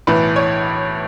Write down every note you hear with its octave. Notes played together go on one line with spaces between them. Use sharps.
B1 A2 E3 B4
C#5